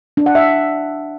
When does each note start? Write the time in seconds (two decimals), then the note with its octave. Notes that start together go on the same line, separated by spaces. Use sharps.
0.17 D4
0.26 F#5
0.35 E5